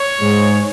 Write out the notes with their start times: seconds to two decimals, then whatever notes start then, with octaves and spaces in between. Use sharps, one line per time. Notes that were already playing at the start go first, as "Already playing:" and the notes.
Already playing: C#5
0.20 G#2 G#3